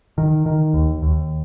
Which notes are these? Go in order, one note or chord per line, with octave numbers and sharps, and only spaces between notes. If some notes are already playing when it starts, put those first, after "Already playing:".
D#3
D#3
D#2
D#2